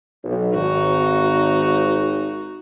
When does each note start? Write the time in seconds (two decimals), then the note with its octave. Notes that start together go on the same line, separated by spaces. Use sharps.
0.23 B1
0.55 G#1 D#4 F#4